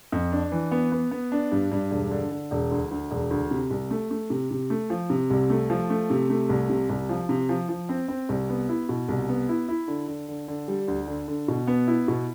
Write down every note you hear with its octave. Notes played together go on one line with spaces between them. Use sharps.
F2
D4
E3
B3
B3
B3
D4
G2
G2
E1
D3
D3
E1
D2
D2
E1
D2
C3
C2
A3
A3
C3
C3
A3
F3
C3
C2
A3
F3
A3
C3
A3
C2
C3
C2
F3
C3
F3
F3
C4
C4
C2
B3
E4
B2
C2
B3
E4
E4
D3
D3
D3
D3
G3
D2
D3
D3
B2
B3
E4
B2